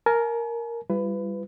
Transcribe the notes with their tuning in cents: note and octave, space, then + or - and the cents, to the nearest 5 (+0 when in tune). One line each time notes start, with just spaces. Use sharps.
A#4 +0 G#5 +45
G3 +10 F4 -45 B4 +20